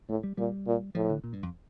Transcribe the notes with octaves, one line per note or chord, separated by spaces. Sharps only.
A2 A3
G3
A#2 G3
A#2
A2 F3
D3
A#2
G2
F2